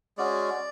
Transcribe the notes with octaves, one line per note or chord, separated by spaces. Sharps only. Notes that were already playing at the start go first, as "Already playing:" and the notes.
G#3 C#4 F#4 D5